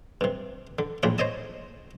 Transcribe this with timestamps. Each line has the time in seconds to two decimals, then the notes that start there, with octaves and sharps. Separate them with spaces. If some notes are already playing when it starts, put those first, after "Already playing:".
0.21 G2 C3
0.79 D3
1.03 A#1 A2 D4 F4 G#4 B5
1.18 C5 C#5 D#5 A5